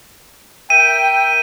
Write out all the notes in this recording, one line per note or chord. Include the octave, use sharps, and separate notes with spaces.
A#4 E5 G5 D#7